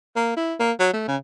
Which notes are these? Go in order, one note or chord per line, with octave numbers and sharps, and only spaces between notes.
A#3
E4
A#3
F#3
A3
C#3